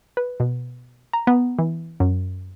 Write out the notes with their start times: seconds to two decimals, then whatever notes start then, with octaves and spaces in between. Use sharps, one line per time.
0.17 B4
0.40 B2
1.13 A#5
1.27 B3
1.59 E3
2.00 F#2